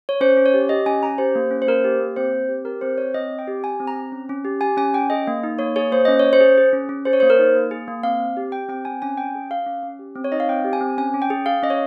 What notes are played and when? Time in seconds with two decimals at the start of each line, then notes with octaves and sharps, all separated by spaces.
0.09 C#5
0.21 C#4 C5
0.37 C#4
0.46 C#5
0.54 G4
0.69 G4 D#5
0.86 C#4 G#5
1.03 C#4 A#5
1.18 G4 C5
1.35 A#3
1.51 C#4
1.62 C5
1.67 A#3 A#4
1.84 G4
2.00 A#3
2.16 C4 C5
2.33 C4
2.49 G4
2.65 G4 A#4
2.81 C4 C5
2.98 C4 C#5
3.14 C4 D#5
3.30 C4
3.39 G5
3.47 G4
3.63 G4 G#5
3.80 C4
3.87 A#5
3.95 C4
4.12 C#4
4.29 C#4
4.45 G4
4.61 G4 G#5
4.77 C#4 G#5
4.93 C#4 G5
5.10 G#4 D#5
5.27 A#3
5.43 D#4
5.59 A#3 C#5
5.76 G#4 C#5
5.92 A#3 C5
6.05 C#4 D#5
6.19 C#5
6.25 C#4
6.33 C5
6.40 G#4
6.58 G#4
6.73 C#4
6.89 C#4
7.05 G#4 C5
7.13 C#5
7.20 A#3 C5
7.30 A#4
7.39 D#4
7.55 A#3
7.71 G#4
7.88 A#3
8.03 C4 F5
8.20 C4
8.37 G4
8.52 G4 G5
8.69 C4 G5
8.85 C4 G#5
9.02 C#4 G#5
9.17 C#4 G5
9.35 G#4
9.50 G#4 F5
9.66 C#4
9.83 C#4
9.99 G4
10.15 C4
10.24 C#5
10.32 D#4 D#5
10.40 F5
10.49 C4 G5
10.64 G4
10.73 G#5
10.81 C4
10.98 C#4 G#5
11.14 C#4
11.22 G5
11.30 G#4
11.46 G#4 F5
11.63 C#4 D#5
11.70 C#5